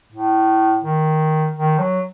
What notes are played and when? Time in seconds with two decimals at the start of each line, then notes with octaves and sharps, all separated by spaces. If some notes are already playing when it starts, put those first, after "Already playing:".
0.12 A2
0.83 D#3
1.55 D#3
1.79 F#3